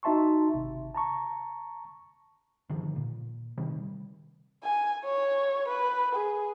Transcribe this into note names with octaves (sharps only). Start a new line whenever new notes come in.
D#4 F#4 E5 A5 C6 C#6
G#1 C3
A5 A#5 C#6
G2 D3 D#3 F3
A#2
C3 D#3 G3
G#5
C#5
B4
G#4